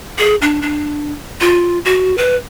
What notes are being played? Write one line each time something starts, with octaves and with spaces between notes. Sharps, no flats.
G#4
D4
D4
F4
F#4
B4